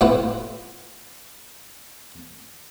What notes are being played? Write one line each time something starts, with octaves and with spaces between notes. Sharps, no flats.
A2 B3 E4 F4 C5 F#5